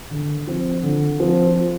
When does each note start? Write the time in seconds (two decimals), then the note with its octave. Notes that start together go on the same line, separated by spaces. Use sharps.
0.10 D3
0.47 F3 C4
0.83 D3
1.20 F3 C4